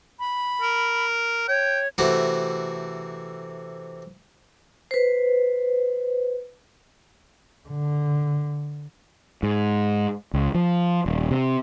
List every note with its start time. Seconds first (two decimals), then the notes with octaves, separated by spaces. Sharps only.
0.19 B5
0.61 A#4
1.48 C#5 G5
1.98 C3 E3 A3 F#4 G4
4.91 B4 C5
7.69 D3
9.43 G#2
10.34 C#2
10.55 F3
11.06 D#1
11.31 C3